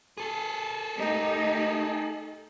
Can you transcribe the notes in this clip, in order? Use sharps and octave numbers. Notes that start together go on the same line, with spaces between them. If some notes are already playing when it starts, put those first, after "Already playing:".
G#4 A4
A3 D#4 G4